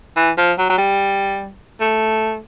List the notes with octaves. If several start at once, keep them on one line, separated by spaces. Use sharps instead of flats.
E3
F3
F#3
F#3
G3
A3